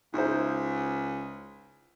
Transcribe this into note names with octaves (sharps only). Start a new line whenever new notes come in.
C#2 D#4 E4 C5